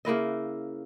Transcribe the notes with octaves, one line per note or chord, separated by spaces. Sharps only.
C#3 A#3 E4 D#5